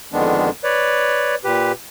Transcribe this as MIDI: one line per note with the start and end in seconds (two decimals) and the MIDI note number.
0.13 0.50 41
0.13 0.50 50
0.13 0.50 51
0.13 0.50 56
0.13 0.50 59
0.13 0.50 62
0.64 1.35 71
0.64 1.35 73
0.64 1.35 74
1.44 1.72 46
1.44 1.72 67
1.44 1.72 71